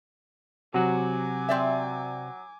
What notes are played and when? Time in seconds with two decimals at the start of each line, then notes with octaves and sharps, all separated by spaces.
0.74 C3 F#3 F#4 G#5 D6
1.49 C4 D5 E5